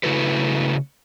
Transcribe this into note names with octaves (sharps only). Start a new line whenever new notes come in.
C#3 A3 E4 F#4 A4 B4